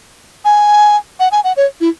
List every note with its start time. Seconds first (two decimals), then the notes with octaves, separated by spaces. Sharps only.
0.45 G#5
1.20 F#5
1.32 G#5
1.44 F#5
1.57 C#5
1.81 E4